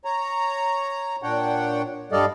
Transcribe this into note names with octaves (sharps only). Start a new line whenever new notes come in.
C#5 A#5
A#2 D4 C#5 F#5 G5
G2 G3 A4 D5 D#5 F5